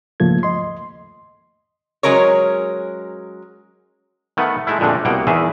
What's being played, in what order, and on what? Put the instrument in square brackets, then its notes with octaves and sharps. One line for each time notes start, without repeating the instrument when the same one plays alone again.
[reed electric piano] C#2 G#2 F3 A3 A#3 G#6
D#2 D#5 C6
[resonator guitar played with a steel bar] F#3 G#3 C#4 A#4 C#5
[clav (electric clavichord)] D#3 A3 B3 F#5
G#3 A3 E4
F2 A#2 D3 G#3 A3
C2 B2 A#3 F#5 G5
E2 D#3 E3 G#4 E5 G#5